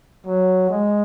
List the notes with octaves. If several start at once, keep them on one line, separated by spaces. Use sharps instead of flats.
F#3
G#3